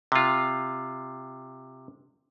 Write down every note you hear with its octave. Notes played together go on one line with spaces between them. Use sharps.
C3 F4